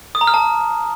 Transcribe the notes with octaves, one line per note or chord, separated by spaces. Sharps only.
D#6
A#5
F6
A5